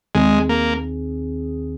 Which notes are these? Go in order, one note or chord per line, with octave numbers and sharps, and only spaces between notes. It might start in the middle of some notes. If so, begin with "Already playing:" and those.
D#2 D#3 G#3 C4 G#4
A#3